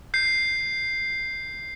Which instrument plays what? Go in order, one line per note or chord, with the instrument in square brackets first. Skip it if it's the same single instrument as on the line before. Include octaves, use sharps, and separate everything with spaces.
[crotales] G6 C7